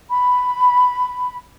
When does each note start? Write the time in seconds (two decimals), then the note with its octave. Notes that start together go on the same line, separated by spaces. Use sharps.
0.11 B5